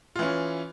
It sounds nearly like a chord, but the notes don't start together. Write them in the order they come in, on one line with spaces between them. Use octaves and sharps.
F4 E3 C#4